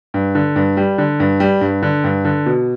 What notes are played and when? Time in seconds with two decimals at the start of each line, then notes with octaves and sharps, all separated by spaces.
0.14 G2
0.35 D3
0.56 G2
0.77 G3
0.98 D3
1.20 G2
1.40 G3
1.61 G2
1.82 D3
2.04 G2
2.25 D3
2.46 B2